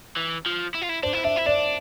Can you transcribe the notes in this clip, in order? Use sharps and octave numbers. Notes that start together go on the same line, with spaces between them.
E3
F3
E4
F4
E4
D4 C5
E4
D4 E5
E4
D4 D5